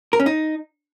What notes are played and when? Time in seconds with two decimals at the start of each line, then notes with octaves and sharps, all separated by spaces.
0.13 A#4
0.20 C#4
0.26 D#4